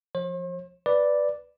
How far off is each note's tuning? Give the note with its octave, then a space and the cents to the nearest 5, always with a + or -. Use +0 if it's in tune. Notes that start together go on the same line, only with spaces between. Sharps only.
F3 +0 C5 +45
B4 +0 D5 +0